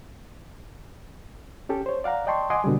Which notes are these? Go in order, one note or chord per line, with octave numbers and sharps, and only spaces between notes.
C#4 G4 A4
C5 C#5
D5 F5 F#5 A#5
D5 D#5 G5 A5 C6 C#6
D#5 F#5 G#5 C6 D6 D#6
B2 D3 D#3 G3